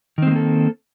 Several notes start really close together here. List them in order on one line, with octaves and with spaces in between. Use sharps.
D#3 C4 G#3 A#3 A4